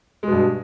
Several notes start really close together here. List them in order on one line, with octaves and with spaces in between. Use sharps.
G#3 B2 G2